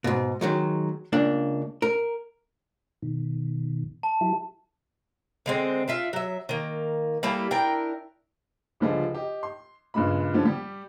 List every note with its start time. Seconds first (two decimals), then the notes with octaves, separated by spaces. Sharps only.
0.04 G#2 B2
0.41 D#3 F#3 G#3
1.13 C#2 A#3 D4
1.82 A#4
3.02 B2 D#3
4.03 A5
4.21 F#3 E4 G4
5.46 D3 G#3 C4
5.88 D4 F4 E5
6.13 F#3 E5
6.49 D#3 A#3
7.23 G3 A#3 E4 A4
7.51 D4 E4 A#4 G5
8.80 C#2 D3 F3 G3 G#4 D#5
9.14 G4 D#5
9.43 C6
9.94 G2 A#2 C#3 G#3 B5
10.34 D3 F3 G3 C#4 D4
10.45 G3 G4